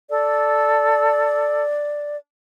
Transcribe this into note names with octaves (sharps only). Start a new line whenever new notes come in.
A4 D5